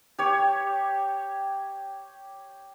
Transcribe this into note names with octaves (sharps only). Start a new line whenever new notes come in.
G4 C#5